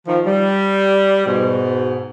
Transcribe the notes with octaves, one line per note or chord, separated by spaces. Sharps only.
D#3 F3
G3
G#2 B2